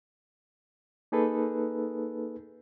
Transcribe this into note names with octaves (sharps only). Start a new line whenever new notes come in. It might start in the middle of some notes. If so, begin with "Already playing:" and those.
A#3 D#4 G#4 A4 B4